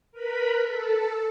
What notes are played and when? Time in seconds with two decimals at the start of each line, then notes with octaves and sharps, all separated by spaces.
0.12 A#4 B4 B5
0.60 A4